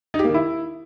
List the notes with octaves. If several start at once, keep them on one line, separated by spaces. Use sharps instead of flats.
D#4
G4
A#3
D#3
E4